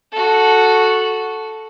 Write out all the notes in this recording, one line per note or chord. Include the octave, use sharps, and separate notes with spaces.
F#4 A4